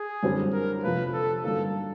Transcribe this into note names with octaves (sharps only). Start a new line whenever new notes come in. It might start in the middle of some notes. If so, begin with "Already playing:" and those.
Already playing: G#4
F#2 D3 G3 C4
A#4
F2 C3 F3 A#3 B4
A4
G2 D3 F#3 A#3 D#4 A4